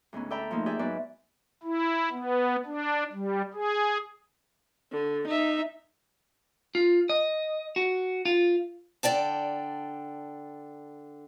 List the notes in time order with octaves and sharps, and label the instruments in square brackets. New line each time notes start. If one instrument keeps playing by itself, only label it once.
[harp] D2 G#2 B3 C#4
A4 D5 E5 G5 A#5 B5
F3 A3 A#3 D#4
G4 G#4 D5 E5 G5
G#2 F#3 B3 B4 D5
[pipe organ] E4
B3
D4
G3
G#4
[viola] D3
D#4 E5
[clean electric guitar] F4
D#5
F#4
F4
[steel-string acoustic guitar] D3 D5 G5 A5